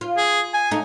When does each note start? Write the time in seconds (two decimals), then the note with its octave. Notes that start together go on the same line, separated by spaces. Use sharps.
0.01 F4
0.17 G#4
0.54 G#5
0.71 A3 D#4